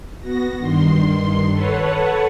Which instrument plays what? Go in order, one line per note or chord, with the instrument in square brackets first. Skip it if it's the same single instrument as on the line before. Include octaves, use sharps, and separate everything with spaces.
[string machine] B3 F#4 A#6
G2 D#3 C6
A4 B4 C#5 F#5